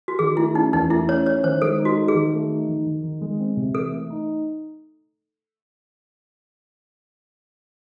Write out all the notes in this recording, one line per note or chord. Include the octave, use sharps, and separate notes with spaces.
F#4
D#3 G#4
A3 E4
C#4 D#4
E2 D#4
A3 E4
C#4 C#5
E4 C#5
D#3 C5
G#3 A4
D#4
F#4
A4
G#4
D#3
A3
D#4
D#3
D#3
D#3
G#3
C4
C3
E3 A4
A3
D#4